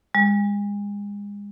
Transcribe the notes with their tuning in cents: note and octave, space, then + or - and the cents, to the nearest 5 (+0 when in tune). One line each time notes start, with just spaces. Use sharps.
G#3 -35